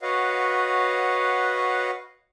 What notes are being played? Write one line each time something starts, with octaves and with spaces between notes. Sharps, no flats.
F#4 B4 C#5 D#5 F5 F#5